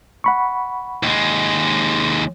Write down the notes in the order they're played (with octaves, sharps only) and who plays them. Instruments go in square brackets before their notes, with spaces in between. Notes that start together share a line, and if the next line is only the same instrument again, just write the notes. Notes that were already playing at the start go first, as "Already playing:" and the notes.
[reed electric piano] F#5 B5 C#6
[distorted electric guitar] D#2 G#3